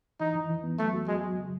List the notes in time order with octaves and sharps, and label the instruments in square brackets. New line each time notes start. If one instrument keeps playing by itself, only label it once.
[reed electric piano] E3 [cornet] D#4
[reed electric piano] E3
E3
B3
[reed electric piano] F#3 [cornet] A3
[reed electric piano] F#4
[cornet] G#3 [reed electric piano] F#4
[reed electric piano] F#3
C#3